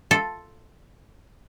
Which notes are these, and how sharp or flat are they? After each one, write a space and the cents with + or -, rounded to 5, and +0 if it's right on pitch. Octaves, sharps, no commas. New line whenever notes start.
F4 +0 A4 +0 E5 +0